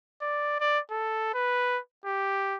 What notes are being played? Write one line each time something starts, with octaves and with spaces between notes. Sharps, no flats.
D5
D5
A4
B4
G4